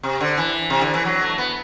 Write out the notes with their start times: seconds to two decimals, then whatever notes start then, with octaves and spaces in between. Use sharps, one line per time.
0.03 C3
0.21 D3
0.38 E3
0.70 C3
0.81 D3
0.94 E3
1.05 F#3
1.21 A3
1.38 B3